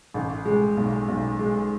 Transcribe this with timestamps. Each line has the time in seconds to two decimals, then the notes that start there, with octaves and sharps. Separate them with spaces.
0.14 A1
0.45 G#3
0.77 B1
1.08 B1
1.39 G#3